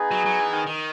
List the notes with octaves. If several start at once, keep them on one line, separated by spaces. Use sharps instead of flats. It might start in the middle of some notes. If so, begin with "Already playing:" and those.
Already playing: B3 D#4 G#4
F#3
F#3
E3
D#3
D#3